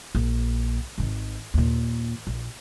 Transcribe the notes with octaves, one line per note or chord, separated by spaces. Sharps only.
A#1
G#1 D#3
D#2 A#2
A#1